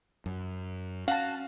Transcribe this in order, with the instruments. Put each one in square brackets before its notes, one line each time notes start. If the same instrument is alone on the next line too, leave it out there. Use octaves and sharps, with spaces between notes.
[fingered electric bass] F#2
[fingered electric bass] C#4 [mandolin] F#4 A5 [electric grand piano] F5